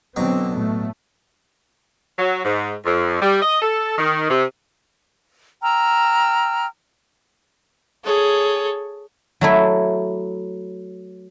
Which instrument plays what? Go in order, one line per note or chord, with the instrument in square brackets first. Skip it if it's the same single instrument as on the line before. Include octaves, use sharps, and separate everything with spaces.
[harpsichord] B2 F#3 A#5 [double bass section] D3 C4
[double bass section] A2 A3
[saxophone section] F#3
G#2
F2
G3
D#5
A4
D#3
C3
[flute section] G5 A#5 E6 F6
[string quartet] G#4 A4 C#5
[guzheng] F#3 A3 E4